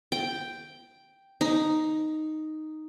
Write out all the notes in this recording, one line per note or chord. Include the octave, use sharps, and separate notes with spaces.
G5
D#4